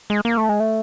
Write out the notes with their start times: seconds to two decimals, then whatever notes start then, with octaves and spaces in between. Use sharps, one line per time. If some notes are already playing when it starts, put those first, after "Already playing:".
0.10 G#3
0.25 A#3
0.37 A3
0.49 G#3
0.60 A3